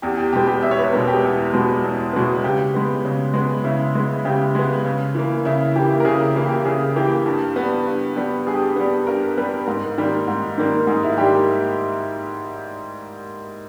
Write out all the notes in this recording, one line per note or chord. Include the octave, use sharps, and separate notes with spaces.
E2 G4
G4
B2 G#3 B3 G4
G4
E2 E5
C#5
B4
B2 G#3 B3 A#4
G4
E2
B2 G#3 B3
E2
B2 G#3 B3
C#3 G4
G#3 B3
C#3
G#3 B3
C#3 E4
G#3 B3
C#3 G4
G#3 B3
C#3
E3 A#3
C#3 E4
E3 A#3 G4
A#4
C#3 G#4
E4
E3 A#3
G4
C#3 G#4
E3 A#3 G4
G2
G3 B3
G2
G3 B3
G2 G#4
G4
G#4
G3 B3
G2 A#4
G3 B3 B4
G#2 A#4
D#3 G3 A#3
G#2
D#3 G3 A#3
G#2 G#4
E4
D#3 G3 A#3 G4